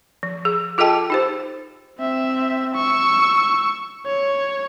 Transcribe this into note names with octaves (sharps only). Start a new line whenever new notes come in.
F3
G#4
F4 G#4 A4 D#5 G5 A5
D#4 G4 C5
C4 E5
C#6 E6
C#5